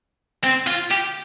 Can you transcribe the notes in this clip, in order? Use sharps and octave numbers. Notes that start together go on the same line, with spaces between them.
C4
F4
G4